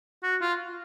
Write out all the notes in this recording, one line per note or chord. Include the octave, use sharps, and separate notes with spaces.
F#4
F4